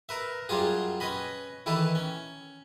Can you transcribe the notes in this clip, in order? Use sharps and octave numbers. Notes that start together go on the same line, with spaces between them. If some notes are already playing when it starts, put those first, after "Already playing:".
A#4 B4 E5
F#2 F#3 G3 F4 G#4
C#4 B4 D#5 B5
D#3 E3 E4 A4 B4
C#4